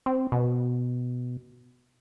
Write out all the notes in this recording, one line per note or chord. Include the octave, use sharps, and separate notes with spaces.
C4
B2